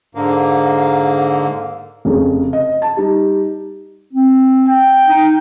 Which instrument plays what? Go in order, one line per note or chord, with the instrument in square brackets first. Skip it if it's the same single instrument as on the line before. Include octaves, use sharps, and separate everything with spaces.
[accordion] G#2 D3 A#3
[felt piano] F1 C#3
D#5
A5
G3 D#4
[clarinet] C4
[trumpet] G5
[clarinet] D#4